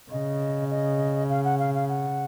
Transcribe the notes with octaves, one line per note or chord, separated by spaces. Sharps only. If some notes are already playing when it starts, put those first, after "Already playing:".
C#3 D#5
D#5
F5
F#5
F5
F5
F#5